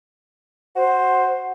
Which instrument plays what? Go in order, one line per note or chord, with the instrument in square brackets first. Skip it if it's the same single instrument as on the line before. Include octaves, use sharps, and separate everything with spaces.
[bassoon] F#4 [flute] C5